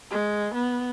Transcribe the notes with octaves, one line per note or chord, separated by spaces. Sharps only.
G#3
B3